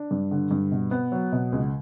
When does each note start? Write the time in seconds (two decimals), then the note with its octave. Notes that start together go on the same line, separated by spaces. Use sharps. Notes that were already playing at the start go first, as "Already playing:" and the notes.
Already playing: D4
0.11 G2
0.31 D3
0.51 G2
0.71 B2
0.91 B3
1.12 F#3
1.32 B2
1.52 C#2